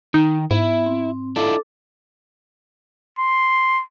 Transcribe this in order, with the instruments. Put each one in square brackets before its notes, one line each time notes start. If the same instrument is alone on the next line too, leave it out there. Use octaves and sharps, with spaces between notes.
[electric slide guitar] D#3 [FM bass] D#4
[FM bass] G#2 [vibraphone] B3 E5 [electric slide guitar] E4
[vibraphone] C4
[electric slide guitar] D4 E4 F4 [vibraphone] A4 D6
[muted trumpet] C6